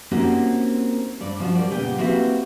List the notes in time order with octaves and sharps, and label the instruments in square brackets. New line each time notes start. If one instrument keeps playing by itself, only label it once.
[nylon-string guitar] A#3 C4 C#4 D#4 F#4 G4
G2 D5
F3 C#4 F4 F#4
G3 A#4 D5
A#2 C#3 B3 G4 G5
A#3 C4 E4 F#4 G4 B4